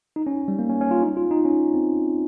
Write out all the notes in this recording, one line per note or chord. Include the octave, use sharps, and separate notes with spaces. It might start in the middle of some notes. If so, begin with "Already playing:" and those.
D#4
C#4
G3
A#3
C#4
C#4
F4
D#4
F4
D#4
C#4
C4